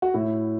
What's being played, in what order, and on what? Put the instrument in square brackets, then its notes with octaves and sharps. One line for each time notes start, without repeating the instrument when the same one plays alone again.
[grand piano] F#4
A2 E4